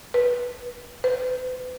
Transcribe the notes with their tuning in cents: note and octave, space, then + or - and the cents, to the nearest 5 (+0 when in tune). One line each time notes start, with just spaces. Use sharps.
B4 -20
B4 +40